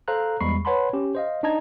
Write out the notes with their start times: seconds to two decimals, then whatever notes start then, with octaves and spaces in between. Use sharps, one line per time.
0.08 A4 C5 F5 A#5 F#6
0.41 E2 G3 G#3 B5 C#6 C7
0.65 B4 C#5 F#5 A5 B5 C6
0.93 C#4 G4
1.15 C5 D#5 F5
1.43 D4 D#4 D#5 A5 A#5 G#6